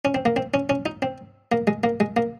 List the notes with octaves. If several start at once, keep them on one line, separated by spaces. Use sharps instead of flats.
C#4
C4
A#3
C4
C#4
C#4
D#4
C4
A#3
G#3
A#3
G#3
A#3